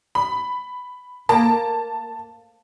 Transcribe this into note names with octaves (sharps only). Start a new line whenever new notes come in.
B5
A#3 A5